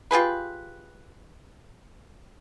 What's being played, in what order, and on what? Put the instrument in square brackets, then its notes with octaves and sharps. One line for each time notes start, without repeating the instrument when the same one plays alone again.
[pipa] F4 G4 G#4 B4